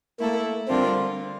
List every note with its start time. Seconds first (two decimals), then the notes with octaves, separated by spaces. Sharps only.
0.19 A3 A#3 E4 A4
0.68 D3 G3 C4 D4 F4 A#4